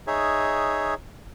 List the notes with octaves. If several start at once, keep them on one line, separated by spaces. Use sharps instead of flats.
D#4 G#4 C#5 E5